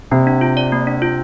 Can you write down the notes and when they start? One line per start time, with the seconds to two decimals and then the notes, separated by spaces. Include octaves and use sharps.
0.11 C3 A#3
0.27 D4
0.41 F4
0.57 D5
0.72 A#3
0.87 D4
1.02 F4